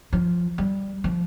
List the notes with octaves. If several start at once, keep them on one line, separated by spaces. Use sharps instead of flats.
F3
G3
F3